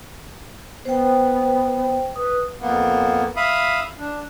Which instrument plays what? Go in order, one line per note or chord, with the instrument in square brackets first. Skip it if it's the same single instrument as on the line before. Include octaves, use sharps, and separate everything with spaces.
[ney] B3 [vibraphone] C5 G5
[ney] B4 [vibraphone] D#6
[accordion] F2 A#3 B3
E5 F5 B5 D#6
D4